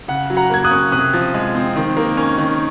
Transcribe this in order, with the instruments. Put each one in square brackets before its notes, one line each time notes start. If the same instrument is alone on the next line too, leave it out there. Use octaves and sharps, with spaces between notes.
[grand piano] C#3 F#5
F#3
F#5 A#5
A#3 G#6
D#6 F#6
C#4
C3 D#6 F#6
F3
G#3
C4
D#3
A#3
C#4
D#3